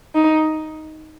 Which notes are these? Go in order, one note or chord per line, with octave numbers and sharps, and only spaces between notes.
D#4